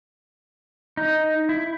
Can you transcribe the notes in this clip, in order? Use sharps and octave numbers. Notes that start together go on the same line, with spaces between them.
D#4
E4